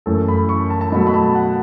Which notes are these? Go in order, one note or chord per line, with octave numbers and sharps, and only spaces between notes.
F#2 E3 A3 A4
B5
C#6
A5
A5
B2 F#3 A3 B5
B5
A5
F#5